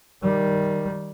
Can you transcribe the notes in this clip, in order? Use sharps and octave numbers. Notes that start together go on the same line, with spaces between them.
D#3 G3